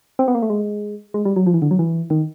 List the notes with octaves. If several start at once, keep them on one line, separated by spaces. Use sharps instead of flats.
C4
B3
A#3
A3
G#3
G#3
G3
F#3
F3
E3
D3
F#3
E3
D#3